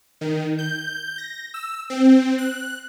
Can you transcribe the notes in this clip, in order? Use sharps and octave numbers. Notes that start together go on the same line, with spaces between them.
D#3
G6
A#6
E6
C4
F#6